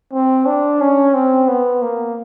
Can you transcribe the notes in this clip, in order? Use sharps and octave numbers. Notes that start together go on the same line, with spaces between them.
C4
D4
C#4
C4
B3
A#3